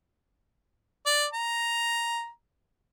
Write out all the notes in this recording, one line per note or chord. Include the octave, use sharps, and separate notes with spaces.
D5
A#5